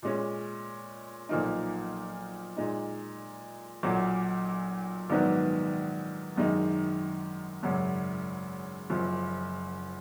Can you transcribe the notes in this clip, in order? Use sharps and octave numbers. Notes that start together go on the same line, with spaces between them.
A#2 G#3 C#4
B1 A#2 F3 A#3 D#4
A#2 G#3 D#4
B1 A#2 F#3
A#1 G#2 D#3 F#3 B3
G#1 F#2 D#3 G#3 D#4
G#1 F#2 C#3 F#3 C#4
F#1 F#2 F3